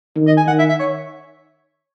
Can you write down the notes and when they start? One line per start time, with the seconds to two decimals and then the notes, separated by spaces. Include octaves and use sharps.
0.16 D#3
0.27 D#5
0.37 G#5
0.47 D#3 F#5
0.59 E5
0.69 E5
0.79 C#5